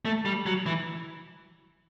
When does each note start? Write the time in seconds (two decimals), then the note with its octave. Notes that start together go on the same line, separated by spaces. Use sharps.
0.05 A3
0.25 G3
0.46 F#3
0.66 E3